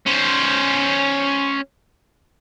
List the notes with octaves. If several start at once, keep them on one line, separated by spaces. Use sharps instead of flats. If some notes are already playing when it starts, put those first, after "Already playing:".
C#4 C5